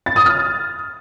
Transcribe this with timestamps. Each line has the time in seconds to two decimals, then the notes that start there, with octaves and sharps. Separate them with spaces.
0.06 A6
0.16 D#6
0.26 F6